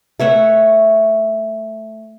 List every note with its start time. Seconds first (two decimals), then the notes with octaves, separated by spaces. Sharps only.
0.20 A3 C#5 E5 F#5